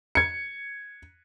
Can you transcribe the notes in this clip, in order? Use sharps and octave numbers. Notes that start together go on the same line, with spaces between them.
G#6 C#7